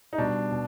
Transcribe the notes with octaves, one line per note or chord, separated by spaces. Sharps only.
D#4
B2 G3 D4
B2